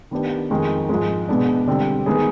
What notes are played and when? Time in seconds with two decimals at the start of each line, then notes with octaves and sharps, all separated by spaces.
0.11 D#3 B3 D4 G4
0.50 F2 D#3 G#3
0.89 G#2 F3 G#3
1.28 B2 G#3 B3 D4
1.68 D3 G3 C4
2.06 D#3 G#3 B3 D#4 G#4